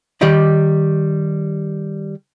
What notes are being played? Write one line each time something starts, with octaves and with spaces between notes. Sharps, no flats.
D#3 G3 G4 D5 D#5 B5